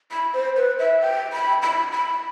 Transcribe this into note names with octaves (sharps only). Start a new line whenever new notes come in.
B5
C5
B4
E5
G5
B5
B5
B5